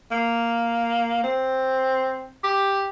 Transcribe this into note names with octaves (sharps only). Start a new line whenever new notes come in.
A#3
C4
G4